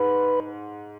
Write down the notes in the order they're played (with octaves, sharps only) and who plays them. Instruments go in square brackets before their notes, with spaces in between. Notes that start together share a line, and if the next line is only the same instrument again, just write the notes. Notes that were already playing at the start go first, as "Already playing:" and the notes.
Already playing: [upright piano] G#2 [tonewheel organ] B4